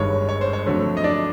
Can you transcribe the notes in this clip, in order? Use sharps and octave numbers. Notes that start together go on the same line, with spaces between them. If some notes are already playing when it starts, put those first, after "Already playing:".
Already playing: G1 G2 D#3 G#3 C#5
C#5
C5
C#5
F2 D3 F#3 A3
D#5
D4 D5